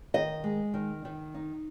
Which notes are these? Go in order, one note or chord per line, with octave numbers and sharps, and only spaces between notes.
D#3 D#5
G#3
D#3
D#3
D#4